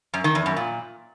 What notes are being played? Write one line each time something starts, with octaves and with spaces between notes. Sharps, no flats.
F#2
D#3
E2
F#2
A#2